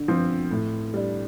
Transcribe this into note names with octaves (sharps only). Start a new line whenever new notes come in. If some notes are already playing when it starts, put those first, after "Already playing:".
Already playing: D3
F3 C4
A2
G3 D4